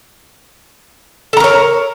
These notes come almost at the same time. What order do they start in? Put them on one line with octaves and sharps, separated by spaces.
A4 A#5 A#4 C#5